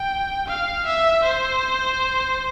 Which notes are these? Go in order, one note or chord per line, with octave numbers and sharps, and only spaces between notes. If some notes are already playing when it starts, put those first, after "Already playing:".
Already playing: G5
F5
E5
C5